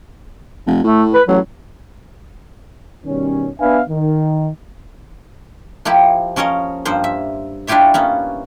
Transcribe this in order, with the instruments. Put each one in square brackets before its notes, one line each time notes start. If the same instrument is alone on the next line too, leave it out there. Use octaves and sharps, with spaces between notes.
[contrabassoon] F1
[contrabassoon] A2 [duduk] A3
[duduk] B4
[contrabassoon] A1 [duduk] F#3
[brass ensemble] B2 D#3 G3 C#4
B3 D4 B4 E5 F5 G#5
D#3
[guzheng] F3 A#3 E4 G4
F3 C#4 A#4 C#5 D#5
G2 F3 A#3 C5
E5
D4 E4 F4 G4 C#5 E5
A#3 B3 C#4